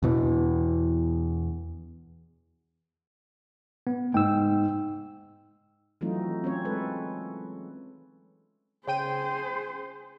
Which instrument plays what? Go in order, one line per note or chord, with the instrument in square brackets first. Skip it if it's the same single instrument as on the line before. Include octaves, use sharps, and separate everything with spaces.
[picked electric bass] E2 B2 E3
[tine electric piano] B3
[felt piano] G#2 [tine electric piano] G5 E6
[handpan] E3 F#3 A3 C4 D#4 F4
C4 C#4 C#5
G#3 A4 B4
[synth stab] C#3 G5 D#7 [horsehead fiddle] G#4 C5